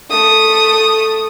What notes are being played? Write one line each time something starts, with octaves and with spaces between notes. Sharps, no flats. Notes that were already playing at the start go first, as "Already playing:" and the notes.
A3 D#6